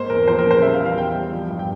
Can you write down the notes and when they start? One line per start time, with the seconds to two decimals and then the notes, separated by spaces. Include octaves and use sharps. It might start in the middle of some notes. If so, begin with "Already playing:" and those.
Already playing: G#2 A#3 C5
0.10 E2 A#4
0.27 F3 C5
0.39 A#4
0.45 C#3
0.51 C5
0.62 G3 E5
0.74 F5
0.80 E2
0.86 F5
0.97 G3 G5
1.15 G3
1.33 F3
1.50 G2
1.59 G5